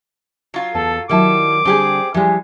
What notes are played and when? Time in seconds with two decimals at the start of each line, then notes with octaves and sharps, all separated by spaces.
0.54 F#3 F4
0.74 E2 B3 A4 A5
1.09 D#3 F#3 G3 E4 A5 D6
1.65 D3 G3 C4 G4 G#4
2.14 E3 F3 G3 G#3 G4